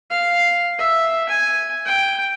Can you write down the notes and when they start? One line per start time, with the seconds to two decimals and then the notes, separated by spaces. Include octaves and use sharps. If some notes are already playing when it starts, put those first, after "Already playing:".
0.10 F5
0.78 E5
1.29 G#5
1.85 G5